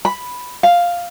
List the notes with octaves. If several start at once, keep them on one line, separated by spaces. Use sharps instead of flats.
B5
F5